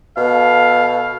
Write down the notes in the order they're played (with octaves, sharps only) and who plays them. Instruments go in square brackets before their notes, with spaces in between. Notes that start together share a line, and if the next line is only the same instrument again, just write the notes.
[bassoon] B2 [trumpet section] A4 F5